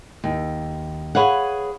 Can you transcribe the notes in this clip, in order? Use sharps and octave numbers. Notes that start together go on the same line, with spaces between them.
D#2
G#4 B4 C#5 F5 F#5